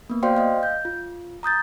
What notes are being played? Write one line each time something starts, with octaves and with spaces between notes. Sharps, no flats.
A#3 B3
F#4 C5 D5 F5 G5 C6
D#5 F5
G6
F4
A#5 D#6 G6 A6